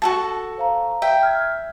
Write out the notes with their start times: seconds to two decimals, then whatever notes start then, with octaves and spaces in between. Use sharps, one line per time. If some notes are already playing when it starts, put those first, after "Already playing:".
0.02 F#4 A4 A5
0.58 C5 F5 A#5
1.02 E5 G5
1.23 F6 G#6